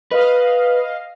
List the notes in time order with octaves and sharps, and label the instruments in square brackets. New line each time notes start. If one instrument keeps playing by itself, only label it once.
[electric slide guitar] B4 [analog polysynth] D#5 F5